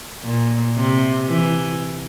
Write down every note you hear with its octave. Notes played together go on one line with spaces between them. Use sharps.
A#2
C3
E3